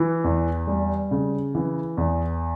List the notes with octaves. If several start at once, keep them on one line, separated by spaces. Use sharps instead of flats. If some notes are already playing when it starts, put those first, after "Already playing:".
Already playing: E3
E2
G3
C#3
E3
E2